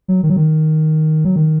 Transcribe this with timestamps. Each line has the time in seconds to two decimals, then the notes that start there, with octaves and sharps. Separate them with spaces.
0.08 F#3
0.23 D#3
0.30 F#3
0.36 D#3
1.25 F#3
1.36 D#3